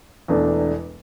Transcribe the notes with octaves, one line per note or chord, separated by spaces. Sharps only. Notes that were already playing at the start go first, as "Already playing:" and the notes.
E1 E2 B2 A3 D4